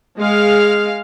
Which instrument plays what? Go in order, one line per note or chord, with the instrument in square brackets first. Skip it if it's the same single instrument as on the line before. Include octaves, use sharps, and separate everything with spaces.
[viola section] G#3 F5